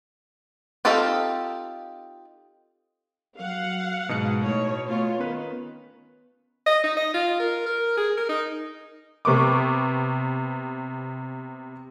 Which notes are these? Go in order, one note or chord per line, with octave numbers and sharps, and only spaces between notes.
C4 D#4 F4 G4 A4
F#3 F5 F#5
G#2 B2 D#4 C#7
A2 C#5
A3 B3 F4 C#5
D#3 B3 C#4 B4
D#5
D#4
D#5
F4
A#4
A#4
G#4
A#4
D#4
C3 B3 C#6 D6